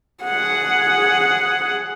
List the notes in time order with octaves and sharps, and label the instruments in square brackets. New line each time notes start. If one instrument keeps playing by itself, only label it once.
[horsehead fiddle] G#4 F#5